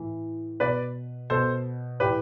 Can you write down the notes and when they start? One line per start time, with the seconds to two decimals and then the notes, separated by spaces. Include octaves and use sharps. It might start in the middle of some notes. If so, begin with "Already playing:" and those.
Already playing: A2 E3
0.60 B2 B4 D5
1.30 B2 A4 C5
2.00 A2 E3 G4 B4